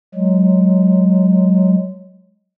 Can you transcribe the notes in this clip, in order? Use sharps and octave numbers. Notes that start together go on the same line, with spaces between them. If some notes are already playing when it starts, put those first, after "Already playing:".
F#3 G#3